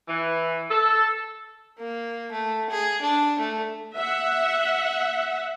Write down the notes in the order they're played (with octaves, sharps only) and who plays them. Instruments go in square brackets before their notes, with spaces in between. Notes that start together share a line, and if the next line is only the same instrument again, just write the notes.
[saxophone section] E3
A4
[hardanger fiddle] A#3
A3
G#4
D4
A3
[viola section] E5 F#5